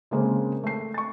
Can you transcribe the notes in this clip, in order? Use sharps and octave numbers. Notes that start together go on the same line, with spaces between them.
C#3 G#3 A#3 C4 G#4
A3 C7
C#6 A6